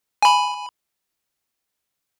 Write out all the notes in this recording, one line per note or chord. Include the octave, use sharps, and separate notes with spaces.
G#5 B5